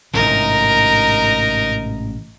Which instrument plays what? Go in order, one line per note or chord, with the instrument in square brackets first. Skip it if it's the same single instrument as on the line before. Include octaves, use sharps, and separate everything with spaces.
[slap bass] A1 G#2 C3 [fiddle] D#4 A#4